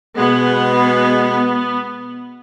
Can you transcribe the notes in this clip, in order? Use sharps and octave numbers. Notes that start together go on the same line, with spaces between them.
B2 G#3 B3